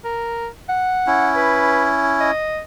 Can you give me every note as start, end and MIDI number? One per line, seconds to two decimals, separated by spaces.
0.04 0.48 70
0.69 1.30 78
1.07 2.31 61
1.07 2.31 64
1.36 1.91 71
2.20 2.60 75